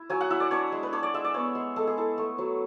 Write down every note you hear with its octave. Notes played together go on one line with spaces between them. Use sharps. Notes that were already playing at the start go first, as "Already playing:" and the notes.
Already playing: E4
F#3 G#5
F#5
E4 E5
D5
D4 C#5
G#3
B4
D4 C#5
D5
G#3 E5
D5
B3 C#5
G#3
G#3 A4
G#4
E4 A4
A3
F#3